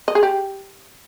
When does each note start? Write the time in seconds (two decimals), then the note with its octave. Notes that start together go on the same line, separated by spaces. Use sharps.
0.08 D#5
0.15 G#4
0.23 G4